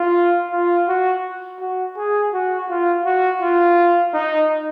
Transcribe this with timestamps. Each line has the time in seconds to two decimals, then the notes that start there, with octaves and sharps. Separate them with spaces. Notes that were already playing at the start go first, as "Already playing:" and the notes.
Already playing: F4
0.52 F4
0.88 F#4
1.60 F#4
1.97 G#4
2.33 F#4
2.69 F4
3.05 F#4
3.41 F4
4.14 D#4